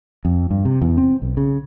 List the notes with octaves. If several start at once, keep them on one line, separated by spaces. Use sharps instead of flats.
F2
G2
C3
E2
C4
B1
C#3